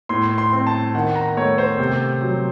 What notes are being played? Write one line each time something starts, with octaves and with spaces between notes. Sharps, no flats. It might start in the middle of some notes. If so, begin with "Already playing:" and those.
A2 C6
C6
C4
A5
D#3 F#5
A#5
A3 C#5
C5
C3
F#3